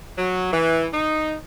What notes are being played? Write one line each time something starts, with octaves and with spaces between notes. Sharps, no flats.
F#3
E3
D#4